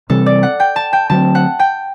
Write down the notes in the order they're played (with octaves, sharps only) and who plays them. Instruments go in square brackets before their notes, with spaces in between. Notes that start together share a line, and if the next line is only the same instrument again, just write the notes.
[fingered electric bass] C3 E3 G3 [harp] A4
[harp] D5
F#5
G5
A5
G5
[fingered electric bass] D3 F#3 C4 [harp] A5
[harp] F#5
G5